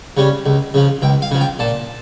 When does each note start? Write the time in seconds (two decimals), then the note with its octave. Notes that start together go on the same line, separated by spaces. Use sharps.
0.17 C#3 G3 C#4
0.46 C#2
0.74 C#3 F3
1.02 C#2 G5
1.22 F5
1.31 C#3 F3
1.41 G5
1.59 A#2 A5